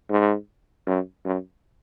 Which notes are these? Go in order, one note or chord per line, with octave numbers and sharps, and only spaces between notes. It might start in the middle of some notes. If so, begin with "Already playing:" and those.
G#2
F#2
F#2